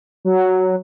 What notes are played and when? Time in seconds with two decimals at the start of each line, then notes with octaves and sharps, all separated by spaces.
0.25 F#3